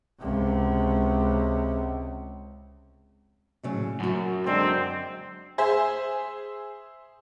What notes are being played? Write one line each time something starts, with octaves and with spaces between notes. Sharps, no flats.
C#2 C3
A2 C#3 F#3
F#2 C#4 F#4
D3 G#3 C4 D4
G#4 C5 E5